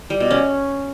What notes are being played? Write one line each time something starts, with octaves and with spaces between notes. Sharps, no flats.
G3
B2
C#4